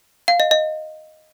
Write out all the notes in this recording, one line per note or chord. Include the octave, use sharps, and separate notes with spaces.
F5
D#5
D#5